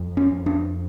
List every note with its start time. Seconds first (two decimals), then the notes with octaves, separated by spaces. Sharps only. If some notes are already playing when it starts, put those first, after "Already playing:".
Already playing: F2
0.17 C#4
0.31 F2
0.46 D4